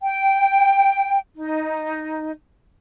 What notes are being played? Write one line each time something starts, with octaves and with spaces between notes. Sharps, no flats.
G5
D#4